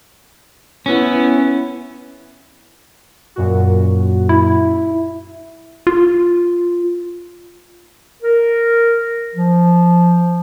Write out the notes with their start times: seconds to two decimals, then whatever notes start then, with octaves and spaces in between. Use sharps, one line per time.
0.86 B3 C#4 E4
3.36 F#2 A#2 F#4
4.29 E4
5.87 F4
8.23 A#4
9.35 F3